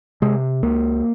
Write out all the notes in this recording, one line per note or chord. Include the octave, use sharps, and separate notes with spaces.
C3 G#3
C#2 A#3